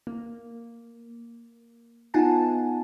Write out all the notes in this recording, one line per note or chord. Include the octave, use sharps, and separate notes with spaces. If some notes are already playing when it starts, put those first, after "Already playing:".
A#3
B3 D#4 F4 F#5 G#5 A5